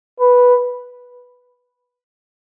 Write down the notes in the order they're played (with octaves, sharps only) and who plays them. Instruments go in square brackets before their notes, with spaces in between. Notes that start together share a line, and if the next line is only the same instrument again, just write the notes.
[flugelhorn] B4